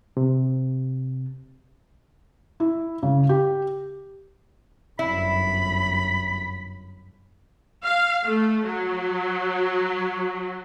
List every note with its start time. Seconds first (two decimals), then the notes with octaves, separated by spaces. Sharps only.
0.17 C3
2.60 E4
3.03 C#3
3.29 G4
4.99 G1 F#2 E4 B5
7.84 F5
8.25 A3
8.66 F#3